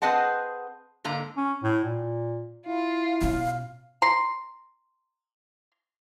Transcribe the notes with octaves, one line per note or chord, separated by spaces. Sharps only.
C4 G#4 B4 D#5 F#5 A5
G#2 D3 A#3 A#5
C#4
A2
A#2
E4 F4
B2 C#4 F5
A#5 C6